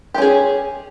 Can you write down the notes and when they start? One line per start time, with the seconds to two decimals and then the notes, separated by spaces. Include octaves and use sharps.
0.14 G4
0.18 C#4
0.22 G#4